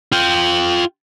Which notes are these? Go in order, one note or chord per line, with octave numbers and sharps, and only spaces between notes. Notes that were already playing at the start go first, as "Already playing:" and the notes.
F4 G5